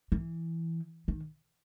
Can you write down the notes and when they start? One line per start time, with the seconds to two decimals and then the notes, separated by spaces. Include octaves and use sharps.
0.12 E3
1.08 D#3